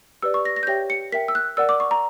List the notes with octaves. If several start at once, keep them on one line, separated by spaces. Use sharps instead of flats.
G4 B4 D5 E6
C#6
A#6
A#6
G6
G4 C#5 E5 G5 A#6
C#7
A#4 E5 G5 B6
E6
F#6
A#4 D5 F#5 E6
D6
C#6
A#5